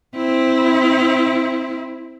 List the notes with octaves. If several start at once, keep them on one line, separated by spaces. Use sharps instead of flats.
C4 E4